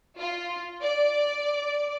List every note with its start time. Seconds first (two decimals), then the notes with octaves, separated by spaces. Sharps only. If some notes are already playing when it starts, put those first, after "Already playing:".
0.19 F4
0.82 D5